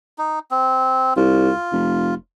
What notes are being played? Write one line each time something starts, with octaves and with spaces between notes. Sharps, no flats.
D#4
C4
C2 F4
F1